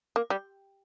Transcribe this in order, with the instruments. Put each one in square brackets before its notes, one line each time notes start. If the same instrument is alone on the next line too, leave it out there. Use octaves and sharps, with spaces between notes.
[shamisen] A#3
G3